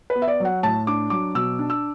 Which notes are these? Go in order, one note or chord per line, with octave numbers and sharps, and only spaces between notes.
B4
B3
E5
D5
F#3 F#5
A2 A5
D4 D6
F#3 D6
B2 E6
D4
E6